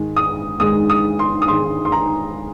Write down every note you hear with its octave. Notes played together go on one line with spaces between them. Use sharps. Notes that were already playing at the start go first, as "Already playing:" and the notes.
Already playing: G#2 D#3 G#3
D#6
G#2 D#3 G#3 D#6
D#6
C6
D#6
G#2 D#3 G#3 C6
C6
A#5